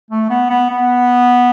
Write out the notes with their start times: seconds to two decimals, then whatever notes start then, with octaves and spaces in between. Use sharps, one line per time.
0.11 A3
0.30 B3
0.50 B3
0.70 B3